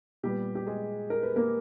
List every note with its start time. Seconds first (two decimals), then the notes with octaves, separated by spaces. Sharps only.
0.23 A#2 G3 B3 G4
0.55 G4
0.67 G#3 G#4
1.10 A#4
1.23 B4
1.36 A#3 A#4